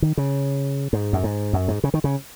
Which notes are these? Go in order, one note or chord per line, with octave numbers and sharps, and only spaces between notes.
D#3
C#3
G#2
F#2
G#2
F#2
G#2
C#3
D#3
C#3